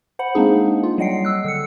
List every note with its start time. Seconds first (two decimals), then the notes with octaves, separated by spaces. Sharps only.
0.19 C5 F#5 B5
0.35 G#3 A#3 C4 D4 D#4 G#4
0.83 F4
0.98 F#3 G3 D#5 F#5 G5 C7
1.25 E6 F#6
1.45 D3 E6 C#7